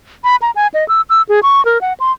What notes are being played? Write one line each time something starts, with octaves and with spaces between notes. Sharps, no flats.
B5
A#5
G#5
D#5
E6
E6
G#4
C#6
A#4
F#5
C6